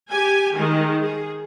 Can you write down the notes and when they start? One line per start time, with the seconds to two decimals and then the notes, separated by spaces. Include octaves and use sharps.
0.10 G4 G#5
0.56 D#3 G#3
1.01 G#4